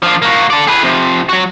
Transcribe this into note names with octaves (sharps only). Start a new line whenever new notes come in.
F3 D4
A#3 F#4
A4 D5
G#4 B4
C3 F3
F#3 F#4